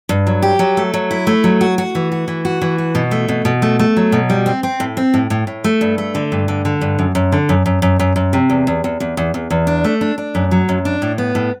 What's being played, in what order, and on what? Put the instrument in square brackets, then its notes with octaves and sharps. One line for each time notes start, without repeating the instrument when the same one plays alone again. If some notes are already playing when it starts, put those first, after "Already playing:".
[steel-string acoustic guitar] G2
F#3
G4
F#3
A3
F#3
E4
A3
F#3
F#4
F#4
E3
F#4
E3
F#4
E3
F#4
B2
A3
B2
B2
A3
A3
F#3
B2
G3
C4
C4
A2
C4
A2
A2
A2
A3
G2
A3
D3
G2
D3
D3
G2
F#2
F#2
D3
F#2
F#2
F#2
F#2
F#2
C3
E2
E2
E2
E2
E2
E2
E2
D4
A3
D4
D4
F#2
F#3
F#2
D4
A2
B3
A2